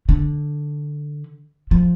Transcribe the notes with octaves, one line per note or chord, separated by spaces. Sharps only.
D3
F3